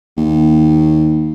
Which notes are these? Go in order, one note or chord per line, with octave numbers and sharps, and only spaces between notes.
D#2